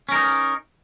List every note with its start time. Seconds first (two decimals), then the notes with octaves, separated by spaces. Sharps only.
0.09 C#4
0.12 A#4
0.15 D#4